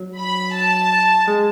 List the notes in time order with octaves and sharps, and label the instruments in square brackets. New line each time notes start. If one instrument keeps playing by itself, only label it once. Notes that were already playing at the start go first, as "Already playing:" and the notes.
Already playing: [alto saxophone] F#3
[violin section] B5
A5
[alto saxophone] G#3